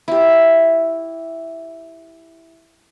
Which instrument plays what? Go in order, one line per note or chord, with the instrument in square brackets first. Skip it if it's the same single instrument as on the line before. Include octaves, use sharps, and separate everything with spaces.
[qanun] E4 G4